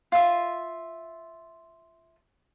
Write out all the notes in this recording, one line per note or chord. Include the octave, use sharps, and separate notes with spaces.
F4 E5